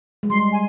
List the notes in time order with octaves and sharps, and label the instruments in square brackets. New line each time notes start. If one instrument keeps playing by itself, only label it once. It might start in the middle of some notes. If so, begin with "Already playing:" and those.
[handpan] G#3
[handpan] G3 [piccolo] C6
[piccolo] G#5